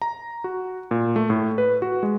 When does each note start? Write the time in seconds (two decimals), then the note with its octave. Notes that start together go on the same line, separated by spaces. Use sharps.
0.02 A#5
0.44 F#4
0.91 A#2
1.16 A3
1.30 A2
1.58 B4
1.82 F#4
2.03 G#3